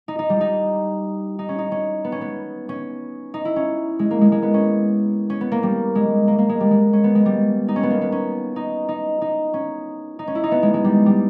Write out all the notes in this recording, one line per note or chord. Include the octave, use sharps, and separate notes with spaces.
D#4
D#4
G3
D#4
D#4
C#4
D#4
C#4
B3
C#4
B3
C#4
D#4
E4
C#4
G#3
A#3
G#3
G#3
B3
C#4
C#4
B3
A#3
G3
G#3
A#3
A#3
G#3
G3
G#3
C#4
B3
G#3
G3
D#4
C#4
B3
A#3
B3
C#4
D#4
D#4
D#4
C#4
D#4
C#4
E4
D#4
B3
G#3
G#3
G3
G3